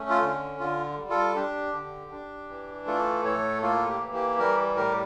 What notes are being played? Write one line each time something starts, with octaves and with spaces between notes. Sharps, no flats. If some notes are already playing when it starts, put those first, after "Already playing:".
Already playing: A3 C#4
F4
D3
D3 F4
G3
F4 A4
D4 G4
D3
D4
E3
A3 F4 A4
A2 A4 C#5
A#3 F4 A4
G4
E3
G4
G3 G4 A#4
A2 G4 A#4